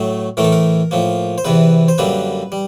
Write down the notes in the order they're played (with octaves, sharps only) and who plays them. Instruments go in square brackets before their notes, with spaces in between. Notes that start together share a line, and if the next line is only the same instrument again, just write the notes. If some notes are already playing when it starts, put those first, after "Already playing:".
Already playing: [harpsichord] A2 F#3 A3
A2 E3 A3 A#4
A4
A#4
A2 F3 A#3
C5
E2 C3 E3 B4
C5
F#2 D3 G3 A#3 B4
G3